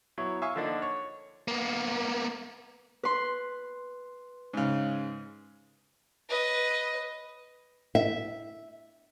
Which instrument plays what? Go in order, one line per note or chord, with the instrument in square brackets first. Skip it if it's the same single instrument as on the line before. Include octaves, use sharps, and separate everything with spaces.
[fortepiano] F#3 B3 E4 C#5
E5 F5 G#5 C#6 D#6
D3 F3 A#3 D4 D#4
C#5
[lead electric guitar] A#3 B3
[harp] B4 C6
[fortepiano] G#2 C#3
[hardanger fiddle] B4 D#5
[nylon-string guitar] E5